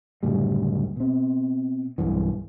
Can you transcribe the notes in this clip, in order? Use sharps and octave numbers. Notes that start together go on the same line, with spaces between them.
F#1 D2 A2 G3
B2 C4
B1 G2 E3